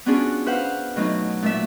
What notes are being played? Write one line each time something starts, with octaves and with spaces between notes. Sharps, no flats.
B3 C#4 D4 F4 F#4 G#4
B4 C5 F5 F#5
B2 F#3 A3 D#4
A#2 A3 E5